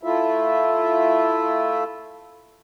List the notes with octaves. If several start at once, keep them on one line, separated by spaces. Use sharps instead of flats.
A3 E4 F4 E5